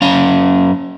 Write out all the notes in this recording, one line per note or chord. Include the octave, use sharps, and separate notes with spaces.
F#2 C#4 F5